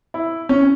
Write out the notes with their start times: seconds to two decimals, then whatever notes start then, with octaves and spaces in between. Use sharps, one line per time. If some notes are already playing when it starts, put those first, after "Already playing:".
0.14 E4
0.49 C#4